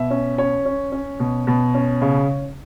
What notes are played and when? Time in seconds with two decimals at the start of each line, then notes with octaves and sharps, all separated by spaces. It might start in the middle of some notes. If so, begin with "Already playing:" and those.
Already playing: B2 E5
0.10 C#4
0.38 C#4 C#5
0.65 C#4
0.92 C#4
1.20 B2
1.47 B2
1.74 C#4
2.01 C#3